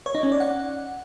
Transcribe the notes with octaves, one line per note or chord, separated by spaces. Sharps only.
C#5
D#4
C#4
D5
F#5